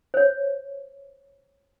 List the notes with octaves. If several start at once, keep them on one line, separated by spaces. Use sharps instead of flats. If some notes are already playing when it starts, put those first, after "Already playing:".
C5 C#5